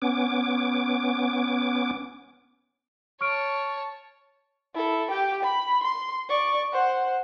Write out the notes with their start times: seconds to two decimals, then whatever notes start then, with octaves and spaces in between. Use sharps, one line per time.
0.02 B3 C#4 D6
3.21 C#5 A5 C#6 F6 D7
4.75 E4 A4
5.11 G4 G5
5.43 B5
5.83 C6
6.29 D5 C#6
6.72 C5 F#5